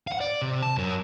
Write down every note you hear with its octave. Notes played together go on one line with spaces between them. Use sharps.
F5 F#5
D5
C3
A5
F#2 A#4